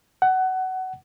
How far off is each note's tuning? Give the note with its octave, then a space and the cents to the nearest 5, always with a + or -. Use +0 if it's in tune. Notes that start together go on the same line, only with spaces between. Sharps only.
F#5 +20